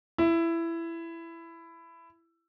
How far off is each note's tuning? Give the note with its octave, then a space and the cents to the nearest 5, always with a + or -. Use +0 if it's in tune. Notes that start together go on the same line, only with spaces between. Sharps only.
E4 +15